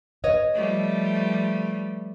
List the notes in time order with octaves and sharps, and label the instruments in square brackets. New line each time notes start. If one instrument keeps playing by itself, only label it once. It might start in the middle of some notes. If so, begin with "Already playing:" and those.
[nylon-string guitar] B4 C#5 D#5
[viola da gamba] F3 G3 A3